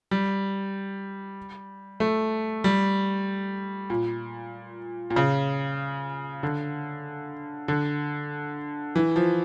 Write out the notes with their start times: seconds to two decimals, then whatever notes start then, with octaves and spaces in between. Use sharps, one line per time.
0.11 G3
2.00 A3
2.64 G3
3.90 A#2
5.10 A#2
5.16 C#3
6.43 D3
7.68 D3
8.96 E3
9.16 F3